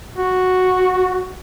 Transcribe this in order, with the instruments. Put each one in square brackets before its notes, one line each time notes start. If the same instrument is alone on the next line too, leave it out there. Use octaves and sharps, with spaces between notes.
[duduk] F#4